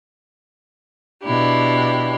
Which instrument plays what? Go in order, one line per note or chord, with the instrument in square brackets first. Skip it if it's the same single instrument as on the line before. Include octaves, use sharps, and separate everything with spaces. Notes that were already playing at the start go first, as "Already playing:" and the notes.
[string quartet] B2 D4 E4 G4